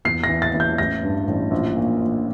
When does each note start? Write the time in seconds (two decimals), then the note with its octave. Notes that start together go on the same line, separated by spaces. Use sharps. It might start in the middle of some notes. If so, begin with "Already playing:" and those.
0.05 E2 C7
0.24 A#6
0.29 E3
0.42 A6
0.54 E3
0.60 G6
0.78 A1 A#6
1.03 G2
1.27 A1
1.51 A#1
1.76 A#2
2.00 A#1